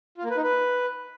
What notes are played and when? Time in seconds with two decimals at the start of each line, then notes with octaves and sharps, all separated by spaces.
0.18 F4
0.24 A#3
0.30 B4
0.37 D#4
0.43 B4